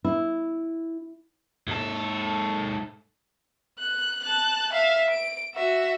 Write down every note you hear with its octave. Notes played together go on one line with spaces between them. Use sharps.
E4
G#2 A4
F#6
A5 F#6
E5 F5
D7
F#4 E5